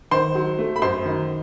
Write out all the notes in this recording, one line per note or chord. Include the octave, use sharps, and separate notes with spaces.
D#3 C5 C6
F#3
A3
B5
F#2 C5 C6
D#3